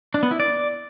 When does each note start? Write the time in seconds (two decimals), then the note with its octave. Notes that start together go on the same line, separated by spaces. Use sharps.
0.14 D4
0.23 B3
0.31 E4
0.40 D5